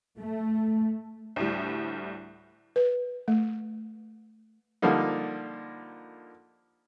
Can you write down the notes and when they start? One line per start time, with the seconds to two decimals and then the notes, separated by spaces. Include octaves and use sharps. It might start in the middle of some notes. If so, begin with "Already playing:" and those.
0.18 A3
1.36 D2 A2 G3
2.76 B4
3.28 A3
4.82 D3 F3 G3 A#3 D#4